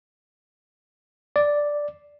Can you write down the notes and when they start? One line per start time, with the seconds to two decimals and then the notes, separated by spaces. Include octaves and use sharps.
1.36 D5